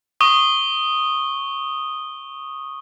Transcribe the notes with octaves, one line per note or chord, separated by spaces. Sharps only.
C#6 D#6 G7